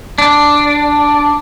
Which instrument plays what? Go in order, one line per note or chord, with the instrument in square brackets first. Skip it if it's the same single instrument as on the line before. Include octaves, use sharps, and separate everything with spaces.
[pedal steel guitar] D4